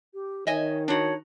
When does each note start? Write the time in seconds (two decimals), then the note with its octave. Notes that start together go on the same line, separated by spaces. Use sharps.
0.14 G4
0.47 D#3 C#5 D#5 E5 G#5
0.88 D4 D#4 F#4 C#5